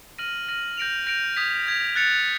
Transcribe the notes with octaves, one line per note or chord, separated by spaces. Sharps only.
F6 A#6 D#7 F#7
F6 A#6 D#7 F#7
G6 A#6 D7 F7
G6 A#6 D7 F7
D#6 G#6 B6
D#6 G#6 B6
F#6 A6 C#7 F7